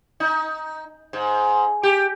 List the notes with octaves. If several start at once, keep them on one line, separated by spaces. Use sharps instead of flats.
D#4
G#2
G4